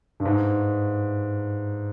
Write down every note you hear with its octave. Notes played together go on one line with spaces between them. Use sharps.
G2
G#2